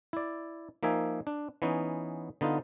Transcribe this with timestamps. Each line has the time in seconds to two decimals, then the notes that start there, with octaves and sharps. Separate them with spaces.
0.13 E4 D5
0.83 F3 A#3 D#4 E5 G#5
1.27 D4
1.62 E3 B3 C#4 D#4
2.41 D3 B3 D#4 F4